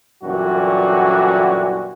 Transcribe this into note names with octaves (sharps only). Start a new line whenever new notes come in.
F#2 A#2 D3 E3 G3 F#4